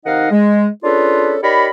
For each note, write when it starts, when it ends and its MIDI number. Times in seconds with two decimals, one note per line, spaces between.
0.06 0.27 48
0.06 0.27 51
0.06 0.27 63
0.06 0.27 75
0.06 0.27 77
0.06 0.27 78
0.31 0.66 56
0.84 1.36 61
0.84 1.36 62
0.84 1.36 65
0.84 1.36 68
0.84 1.36 69
0.84 1.36 71
1.43 1.69 63
1.43 1.69 67
1.43 1.69 70
1.43 1.69 73
1.43 1.69 74
1.43 1.69 83